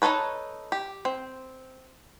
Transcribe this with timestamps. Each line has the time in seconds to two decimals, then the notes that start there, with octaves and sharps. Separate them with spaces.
0.02 D#4 F4 A4 B4 C#5
0.72 G4
1.05 C4